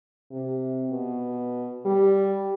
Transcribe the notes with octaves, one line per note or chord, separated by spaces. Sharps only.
C3
B2
G3